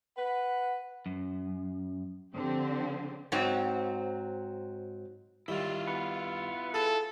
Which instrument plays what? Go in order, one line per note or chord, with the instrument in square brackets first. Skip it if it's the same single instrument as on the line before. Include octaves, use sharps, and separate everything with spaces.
[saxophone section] B4 [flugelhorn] F#5
[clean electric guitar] F#2
[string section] D3 F3 C4 G4
[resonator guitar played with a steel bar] G#2 F#3 C4
[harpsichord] D#3 G3 [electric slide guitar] E4 F4
[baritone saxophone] B3
[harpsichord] G#4 [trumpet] A4